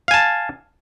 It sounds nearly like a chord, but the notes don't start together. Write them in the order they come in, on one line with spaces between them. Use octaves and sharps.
F5 G#5 A5